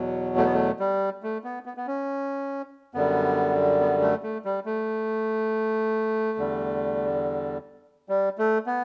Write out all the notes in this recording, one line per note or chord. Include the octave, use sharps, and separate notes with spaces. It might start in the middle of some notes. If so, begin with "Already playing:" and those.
Already playing: E2 B2 F#3
A3
B3
A3
G3
A3
B3
B3
B3
C#4
F#2 D3 G3 B3
B3
A3
A3
G3
A3
E2 D3 G3
G3
A3
B3